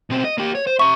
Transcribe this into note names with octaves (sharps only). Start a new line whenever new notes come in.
B2 C4
D#5
A#3 G4
C#5
C5
E5 A#5 C#6